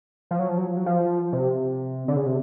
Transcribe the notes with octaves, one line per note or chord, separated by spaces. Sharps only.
F3
F#3
F3
F#3
F3
F#3
F3
C3
D3
C#3
C3